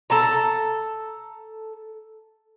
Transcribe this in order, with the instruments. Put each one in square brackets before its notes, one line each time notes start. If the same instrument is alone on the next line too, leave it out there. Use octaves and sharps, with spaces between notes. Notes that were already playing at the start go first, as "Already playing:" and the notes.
[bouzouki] A4 A5 A#5